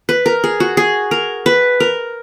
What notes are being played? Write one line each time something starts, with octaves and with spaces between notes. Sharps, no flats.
B4
A#4
G#4
F#4
G#4
A#4
B4
A#4